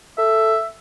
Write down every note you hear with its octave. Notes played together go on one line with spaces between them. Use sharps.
A4 E5